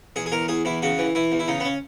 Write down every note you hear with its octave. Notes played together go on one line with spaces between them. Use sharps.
E2 G#4
G#4
E2 A#4
E2 G#4
E2 E4
C#3 F#4
E3
E3 E4
E2
E4
C#3 D#4
B3
C#4